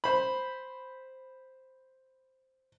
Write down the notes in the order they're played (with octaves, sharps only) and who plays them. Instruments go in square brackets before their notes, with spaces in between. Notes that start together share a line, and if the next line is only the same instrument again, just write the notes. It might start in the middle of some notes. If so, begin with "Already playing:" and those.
[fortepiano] C5 B5